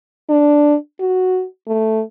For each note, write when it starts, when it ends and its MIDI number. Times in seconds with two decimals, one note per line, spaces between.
0.29 0.75 62
1.00 1.44 66
1.67 2.01 57